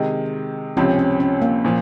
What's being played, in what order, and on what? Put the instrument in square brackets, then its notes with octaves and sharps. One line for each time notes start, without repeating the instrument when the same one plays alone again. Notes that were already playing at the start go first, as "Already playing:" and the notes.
Already playing: [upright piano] C3 D#3 G#3
[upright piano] C#2 C3 F3 C4 [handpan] C#4
[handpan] C#4
C#4
A#3
[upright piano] A#2 F3